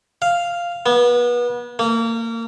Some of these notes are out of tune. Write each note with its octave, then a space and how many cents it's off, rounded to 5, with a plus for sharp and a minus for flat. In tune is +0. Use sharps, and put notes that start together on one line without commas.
F5 -5
B3 -30
A#3 -30